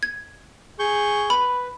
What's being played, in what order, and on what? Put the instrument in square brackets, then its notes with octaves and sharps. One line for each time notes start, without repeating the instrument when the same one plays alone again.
[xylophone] G#6
[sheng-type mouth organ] G#4 C#6 G6
[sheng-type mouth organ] B4 [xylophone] B5